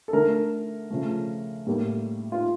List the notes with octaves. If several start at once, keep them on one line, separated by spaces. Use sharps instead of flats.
A4
D3 A3 A#4
C#3 F3 A3
A2 G3 A#3
F4